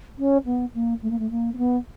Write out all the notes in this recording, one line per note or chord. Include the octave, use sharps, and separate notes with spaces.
C#4
B3
A#3
A3
A#3
A3
A#3
C4
B3